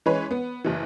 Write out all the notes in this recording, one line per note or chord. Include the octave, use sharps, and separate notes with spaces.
E3 G#3 C#4 B4 C#5
B3
F#1 E3